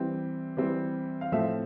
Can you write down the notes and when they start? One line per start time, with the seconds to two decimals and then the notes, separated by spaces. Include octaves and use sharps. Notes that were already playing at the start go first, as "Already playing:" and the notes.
Already playing: E3 G3 C4
0.57 E3 G3 C4
1.21 F5
1.32 A2 F3 A3 C4 E5